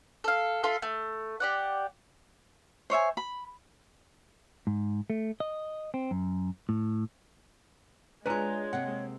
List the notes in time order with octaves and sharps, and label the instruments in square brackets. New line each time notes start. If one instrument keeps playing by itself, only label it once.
[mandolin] A4 F5
F4 A4 E5 C6
A3
G4 D5 F#5
[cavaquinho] C5 C#5 E5 G#5
B5
[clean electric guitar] G#2
A3
D#5
C4
F#2
A2
[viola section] G#3 [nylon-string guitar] D4 F4 [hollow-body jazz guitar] B4 G#5 A#5 [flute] C#5
[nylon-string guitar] C3 A#3 [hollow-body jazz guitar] F#5